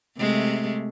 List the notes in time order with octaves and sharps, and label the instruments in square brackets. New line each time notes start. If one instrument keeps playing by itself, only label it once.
[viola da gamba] C3 G#3 A3